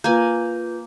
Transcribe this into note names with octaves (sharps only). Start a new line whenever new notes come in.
A#3 F4 B4 G#5 G6